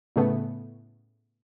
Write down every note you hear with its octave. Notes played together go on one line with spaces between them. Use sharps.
A2 C#3 A3 B3